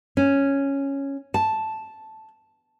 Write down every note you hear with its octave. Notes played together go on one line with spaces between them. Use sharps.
C#4
A5